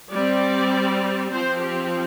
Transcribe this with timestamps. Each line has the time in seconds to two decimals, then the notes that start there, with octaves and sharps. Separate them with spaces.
0.11 G3 C4 D5
1.31 F3 C4 C5
1.60 G4